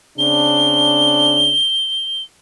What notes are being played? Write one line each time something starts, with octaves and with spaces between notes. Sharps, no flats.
C#3 C4 D4 G7